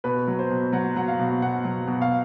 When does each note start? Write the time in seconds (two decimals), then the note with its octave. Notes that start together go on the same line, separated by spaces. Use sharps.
0.04 B2 B4
0.28 F#3
0.39 C5
0.50 B2
0.73 F#3 F#5
0.96 F#3 F#5
1.08 F5
1.19 B2
1.42 B2 F#5
1.65 F#3
1.87 B2
2.02 F5